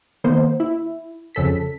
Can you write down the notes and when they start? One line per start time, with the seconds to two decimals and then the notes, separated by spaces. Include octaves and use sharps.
0.24 D#3 A#3 B3 C5
0.60 E4
1.35 F2 C#3 A4 B6